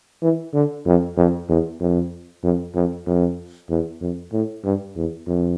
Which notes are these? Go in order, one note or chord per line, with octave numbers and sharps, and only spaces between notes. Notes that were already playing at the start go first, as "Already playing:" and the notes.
E3
D3
F2
F2
E2
F2
F2
F2
F2
E2
F2
A2
G2
E2
F2